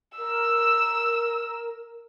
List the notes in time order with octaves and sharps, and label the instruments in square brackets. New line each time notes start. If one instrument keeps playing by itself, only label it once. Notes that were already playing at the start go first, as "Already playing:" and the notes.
[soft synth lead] A#4 [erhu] E6